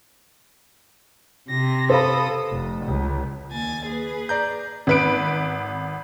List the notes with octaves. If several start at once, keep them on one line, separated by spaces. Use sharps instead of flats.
C3 A#6
A4 C5 F5 B5 D#6
F1
C#2
D#2 G#5 A6
G#4 B4
D5 A#5 G6
G#1 B4 D7